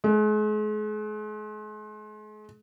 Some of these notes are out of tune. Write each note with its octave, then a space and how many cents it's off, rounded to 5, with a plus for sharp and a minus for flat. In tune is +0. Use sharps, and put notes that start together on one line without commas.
G#3 +40